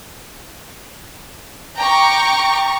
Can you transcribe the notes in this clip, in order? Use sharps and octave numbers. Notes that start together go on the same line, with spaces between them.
G5 A#5 C#6 D6